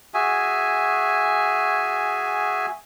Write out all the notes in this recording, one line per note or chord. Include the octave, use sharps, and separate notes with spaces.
F#4 G#4 E5 G#5